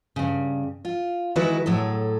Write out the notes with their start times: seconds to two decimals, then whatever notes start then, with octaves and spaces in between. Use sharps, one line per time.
0.16 G2 C#3
0.85 F4
1.36 D#3 E3 G#3 E4 F#4 B4
1.66 A2 F#3 G#4 A4